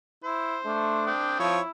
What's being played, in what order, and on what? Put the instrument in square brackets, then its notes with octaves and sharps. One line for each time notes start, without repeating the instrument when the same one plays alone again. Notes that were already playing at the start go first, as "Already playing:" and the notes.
[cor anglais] E4 [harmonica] C5
[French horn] A3 [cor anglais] D4
[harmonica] C4 D#6 [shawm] G5
[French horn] F3 [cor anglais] E4 [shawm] C#5